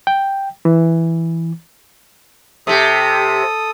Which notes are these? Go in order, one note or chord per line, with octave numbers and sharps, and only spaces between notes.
G5
E3
C3 G4 A4 D#6